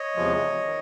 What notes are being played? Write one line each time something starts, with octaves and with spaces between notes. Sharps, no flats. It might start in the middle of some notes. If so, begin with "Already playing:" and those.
Already playing: C#5 D#5
E2 C3 F3 G#3
D#3